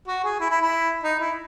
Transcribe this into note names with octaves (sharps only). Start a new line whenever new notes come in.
F#4
G#4
E4
E4
E4
D#4
E4